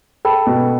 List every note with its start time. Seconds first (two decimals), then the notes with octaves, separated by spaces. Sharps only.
0.25 A4 G5 B5
0.47 B2